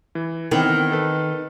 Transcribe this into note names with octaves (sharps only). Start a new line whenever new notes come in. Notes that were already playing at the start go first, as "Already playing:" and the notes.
E3
D#3 E3 B3 C4
A4 B4